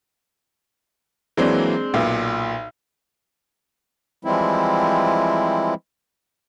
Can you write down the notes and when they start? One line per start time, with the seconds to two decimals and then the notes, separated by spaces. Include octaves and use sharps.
1.37 E3 F#3 G#3 A#3 C4 D4
1.94 B1 A#2
4.25 E3 F3 G3 G#3 C4 E4